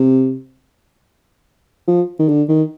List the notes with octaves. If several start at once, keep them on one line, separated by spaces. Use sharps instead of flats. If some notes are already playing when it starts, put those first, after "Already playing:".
Already playing: C3
F3
D#3
D3
D#3